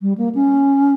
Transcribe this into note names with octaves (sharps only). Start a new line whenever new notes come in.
G3
A#3
C#4